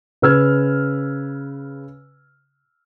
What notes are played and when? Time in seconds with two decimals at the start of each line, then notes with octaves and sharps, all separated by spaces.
0.22 C#3 B4 E6 F6 G#6